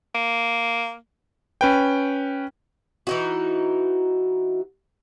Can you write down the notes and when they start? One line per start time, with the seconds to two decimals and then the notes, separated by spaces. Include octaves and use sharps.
0.15 A#3
1.61 C#4 B4 G5
3.07 E3 D#4 F#4